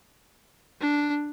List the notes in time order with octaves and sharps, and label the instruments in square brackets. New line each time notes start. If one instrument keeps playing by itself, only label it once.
[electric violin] D4